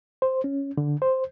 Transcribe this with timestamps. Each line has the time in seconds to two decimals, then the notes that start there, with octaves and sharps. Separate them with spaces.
0.22 C5
0.44 C#4
0.77 D3
1.02 C5